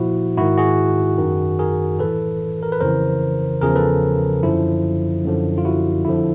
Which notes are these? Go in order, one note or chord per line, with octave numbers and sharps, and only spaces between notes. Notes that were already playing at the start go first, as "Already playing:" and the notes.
Already playing: A#2 F3 E4 F#4
G#2 D#3 E4 F#4
F#4 G#4
F#2 D#3
G#4 A#4
A2 E3 A4 B4
A#4
B4
F2 C#3 E3 A#4 C5
E2 C#3 F3 G#4 A#4
A4 B4
F#2 D3 F3 E4
F#2 D3 F3
F4
E4 F#4
F2 D3 F3 E4